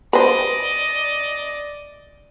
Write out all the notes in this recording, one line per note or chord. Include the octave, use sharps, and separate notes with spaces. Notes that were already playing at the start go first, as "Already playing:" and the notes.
B4 C5 D5 D#5